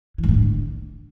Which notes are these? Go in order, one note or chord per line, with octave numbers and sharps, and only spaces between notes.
E3
G#2
A2
D3